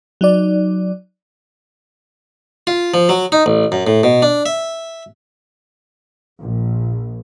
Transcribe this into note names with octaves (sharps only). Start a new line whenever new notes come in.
F#3 D#4 D5
F4
F3
F#3
D#4
A1
F#2
A2
B2
D4
E5
A#1